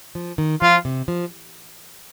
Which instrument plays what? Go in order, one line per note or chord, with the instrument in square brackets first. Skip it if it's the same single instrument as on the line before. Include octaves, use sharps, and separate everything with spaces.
[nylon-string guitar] F3
D#3
[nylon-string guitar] F3 [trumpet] F4
[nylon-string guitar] C3
F3